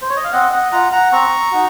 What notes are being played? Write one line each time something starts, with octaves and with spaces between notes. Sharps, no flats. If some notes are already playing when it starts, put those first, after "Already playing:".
C5
C#5
D#5
F5
C4 D#5 F#5
D#5 F#5
F4 F#5 A#5
F#5 A#5
C4 A#5 C#6
D#4 F#4